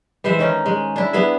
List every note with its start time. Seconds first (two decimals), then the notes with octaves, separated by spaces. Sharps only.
0.24 E3 G#3 C5 E5
0.39 D#3 C#4 D#4
0.66 G#3
0.96 D4 E4
1.13 B3 E4 G#4 E5